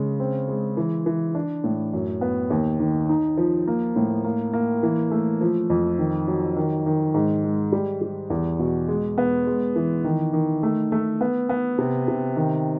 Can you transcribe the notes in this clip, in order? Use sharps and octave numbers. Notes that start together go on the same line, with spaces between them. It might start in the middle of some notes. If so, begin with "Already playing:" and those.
Already playing: C#3 G#3
C4
G#3
E3
E3
D4
A2
F#2
B3
D#2
D#3
D#4
F3
A#3
A2
A#3
A#3
E3
A3
F3
F2
D#3
F#3
D#3
D#3
G#2
G#3
G3
G3
E2
B2
G#3
B3
G#3
E3
D#3
D#3
A3
A3
B3
B3
C3
C3
D#3